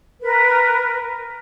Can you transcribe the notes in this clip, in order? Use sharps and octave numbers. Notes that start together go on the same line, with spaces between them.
A#4 B4